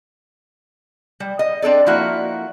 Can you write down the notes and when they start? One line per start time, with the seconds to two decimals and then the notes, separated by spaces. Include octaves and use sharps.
1.20 G3
1.39 D#5
1.62 C4 D4 A4 D5
1.86 F3 A#3 E4 F#4